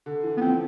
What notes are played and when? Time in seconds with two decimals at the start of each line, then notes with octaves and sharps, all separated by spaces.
0.06 D3
0.23 E3
0.37 B3
0.41 F3 C4